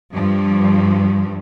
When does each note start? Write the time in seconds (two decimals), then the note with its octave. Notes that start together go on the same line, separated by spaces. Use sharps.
0.14 G2 F3